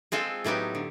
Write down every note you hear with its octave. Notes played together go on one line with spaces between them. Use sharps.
G#3 C4 F4 A4
A2 F#3 B3 D#4 G4
D3